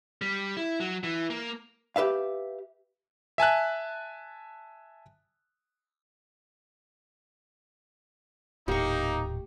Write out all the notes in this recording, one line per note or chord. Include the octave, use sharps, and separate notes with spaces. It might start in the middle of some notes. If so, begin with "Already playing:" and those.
G3
E4
F#3
E3
A#3
G4 B4 E5 F5
E5 G#5 A5 F#6
D#1 A2 A#3 D#4 G4 C#6